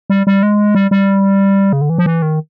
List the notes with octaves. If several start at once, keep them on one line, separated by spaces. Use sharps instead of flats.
G3
G3
G#3
G3
G3
C#3
D3
E3
F3
E3
D#3